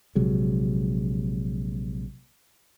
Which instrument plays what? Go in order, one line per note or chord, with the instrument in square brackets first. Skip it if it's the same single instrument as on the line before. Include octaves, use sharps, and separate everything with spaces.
[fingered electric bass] A#1 C3 F#3 G#3